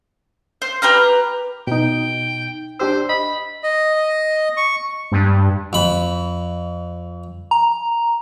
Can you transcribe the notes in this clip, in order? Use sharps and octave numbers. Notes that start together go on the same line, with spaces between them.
C5
G4 B4 A#5 F6
B2 D#4 G5
D4 G4 C5 E6
D#5 B5
D#5
C#6
G2
F2 B5
A#5